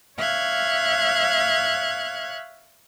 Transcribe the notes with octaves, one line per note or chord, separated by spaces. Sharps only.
C#5 E5 F5 F6 F#6 G#6